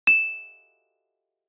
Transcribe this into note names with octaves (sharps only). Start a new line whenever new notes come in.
E7